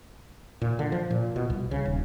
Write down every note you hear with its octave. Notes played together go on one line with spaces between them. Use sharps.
A#2
D3
F3
A#2
B2
C2
C#3
D#1